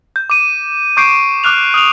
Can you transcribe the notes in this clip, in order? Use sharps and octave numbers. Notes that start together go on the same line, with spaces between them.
G6
D6 D#7
C#6 D6 G6 C7 D7
D6 F6 F#6 F7
D#6 F6 F7